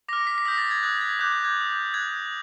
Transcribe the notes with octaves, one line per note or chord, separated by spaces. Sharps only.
D6 F6 A#6
B6
B6
D#6 G6 A#6
A6
G#6
D#6 F#6 G#6
G#6
D6 F#6 G6
G6
G#6
D#6 G6
D#6 F#6 G#6